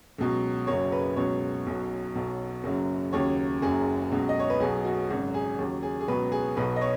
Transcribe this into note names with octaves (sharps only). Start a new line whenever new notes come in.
C#2 B2 F#3
F#1 F#2 C#3 F#3 C#5
B4
C#2 B2 F#3 C#5
B1 B2 F#3
B1 B2 F#3
F#1 F#2 C#3 F#3
D#2 C#3 F#3 C#5
F#1 F#2 F#3 G#4
C#2 B2 F#3
D#5
C#5
B4
B1 B2 F#3 G#4
F#4
G#1 F#2 C#3 F#3 F#4
G#4
D#2 C#3 F#3
G#4
G#4
C#2 B2 F#3 B4
G#4
B1 B2 F#3 B4
D#5
C#5